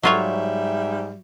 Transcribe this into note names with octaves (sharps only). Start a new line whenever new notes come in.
G#2 F#3 G3 F4 C#5 E5